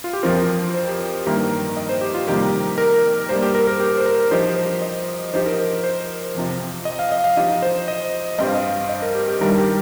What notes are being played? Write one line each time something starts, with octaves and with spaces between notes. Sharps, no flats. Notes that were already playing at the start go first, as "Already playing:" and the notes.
F4
G4
F2 F3 C4 A#4
C5
G4
G4
G2 D#3 A#3 G4
D#5
C5
G4
F4
F2 C3 D#3 G3 A#3 G4
A#4
G2 G3 A#3 C5
G4
A#4
A#4
G4
C5
A#4
F3 D#4 G4 C5
C5
D#5
F3 D#4 G4 C5
A#4
C5
C5
F2 C3 F3
D#5
F5
D#5
F5
F3 D#4 G4 D#5
C5
D#5
G2 G3 C4 D#5
F5
D#5
D#5
A#4
G4
G4
G2 D#3 G3 A#4
G4